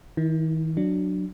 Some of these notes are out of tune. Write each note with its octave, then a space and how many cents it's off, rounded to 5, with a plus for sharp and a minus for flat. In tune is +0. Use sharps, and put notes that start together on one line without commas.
D#3 +40 E4 +0
F#3 +0 D4 +10